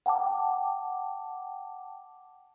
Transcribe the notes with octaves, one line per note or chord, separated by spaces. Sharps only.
F#5 G5 A5 D6